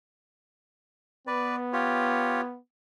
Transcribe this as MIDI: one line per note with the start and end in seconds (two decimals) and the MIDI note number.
1.27 2.58 59
1.27 1.55 71
1.27 1.55 74
1.73 2.41 65
1.73 2.41 67
1.73 2.41 73